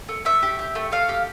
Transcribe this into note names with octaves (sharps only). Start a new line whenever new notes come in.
A3
A3 E5
G4
G4
A3
A3 F5
G4